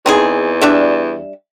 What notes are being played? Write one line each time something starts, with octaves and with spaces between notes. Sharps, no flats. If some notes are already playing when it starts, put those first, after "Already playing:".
E2 C4 D#4 G#4
G3 D4 E5